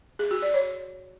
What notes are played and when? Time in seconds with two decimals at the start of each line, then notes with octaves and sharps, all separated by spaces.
0.19 G#4
0.31 F#4
0.42 D5
0.54 C#5